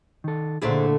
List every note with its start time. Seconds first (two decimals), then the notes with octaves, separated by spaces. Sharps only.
0.24 D#3 A4
0.62 A#2 D3 A3 D4 E4 G#4 C5